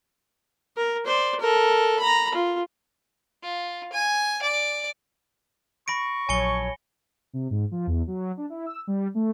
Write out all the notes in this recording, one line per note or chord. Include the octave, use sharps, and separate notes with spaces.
A#4
C5 D5
A4 A#4
A#5 B5
F4
F4
G#5
D5
B5 C#6 A#6 D7
A#1 F#3 C#5 G#5 A5 C#7 G7
C3
G#2
F3
E2
F#3
D4
E4
E6
G3
A3